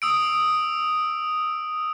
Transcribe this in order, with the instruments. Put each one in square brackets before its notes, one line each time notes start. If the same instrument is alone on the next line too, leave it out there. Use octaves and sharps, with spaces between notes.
[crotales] D#6 E6 D7